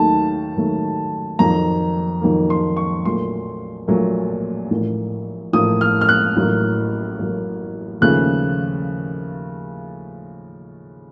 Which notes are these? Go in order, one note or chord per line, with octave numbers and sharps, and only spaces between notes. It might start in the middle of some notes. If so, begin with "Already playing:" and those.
Already playing: D#2 D#3 F#3 A3 A5
D#2 D#3 F#3 A3
F2 D#3 F#3 A#3 A#5
F2 D#3 F#3 A#3
C6
C#6
A#1 A#2 F#3 A3 C6
A#1 A#2 F#3 A3
A1 A2 F3 A#3
A1 A2 F3 A#3 D#6
F6
F6
F#6
A1 A2 F#3 A#3
A1 A2 F#3 A#3
D#2 C#3 F3 A3 F#6